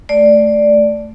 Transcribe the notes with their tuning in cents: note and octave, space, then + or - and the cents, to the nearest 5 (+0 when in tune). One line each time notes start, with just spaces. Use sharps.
A3 +0 D5 +0